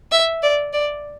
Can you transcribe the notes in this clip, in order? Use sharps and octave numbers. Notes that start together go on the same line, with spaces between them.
E5
D5
D5